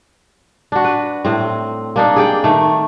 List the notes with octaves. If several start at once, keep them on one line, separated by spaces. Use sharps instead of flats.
D4 F#4
B4
A2 C4
A#3 D4 D#4
G#4 D5 G5
D#3 A3